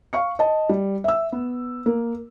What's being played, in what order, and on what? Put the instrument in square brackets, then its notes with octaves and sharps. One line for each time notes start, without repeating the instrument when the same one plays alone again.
[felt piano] F5 C#6 C#7
D#5 A5
G3
E5 E6
B3
A#3